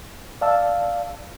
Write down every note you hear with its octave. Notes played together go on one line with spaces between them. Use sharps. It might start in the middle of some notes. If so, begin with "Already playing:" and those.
D5 F5 A5 E6